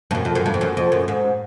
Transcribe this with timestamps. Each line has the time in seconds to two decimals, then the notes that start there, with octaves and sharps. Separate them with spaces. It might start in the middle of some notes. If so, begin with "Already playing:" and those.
0.11 G2
0.15 F#2
0.25 F2
0.35 F#2
0.46 G2
0.54 F2
0.61 F#2
0.77 F2
0.92 F#2
1.08 G#2